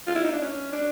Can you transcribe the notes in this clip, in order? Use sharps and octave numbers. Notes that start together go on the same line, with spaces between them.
F4
E4
D#4
D4
C#4
D4